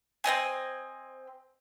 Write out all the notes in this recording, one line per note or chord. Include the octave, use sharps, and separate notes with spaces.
C4 C#5 D#5 G#5